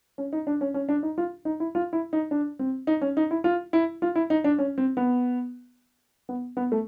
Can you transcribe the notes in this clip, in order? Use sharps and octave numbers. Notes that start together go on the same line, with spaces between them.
C#4
D#4
D4
C#4
C#4
D4
D#4
F4
D#4
E4
F4
E4
D#4
D4
C4
D#4
C#4
D#4
E4
F4
E4
F4
E4
D#4
D4
C#4
C4
B3
B3
B3
A3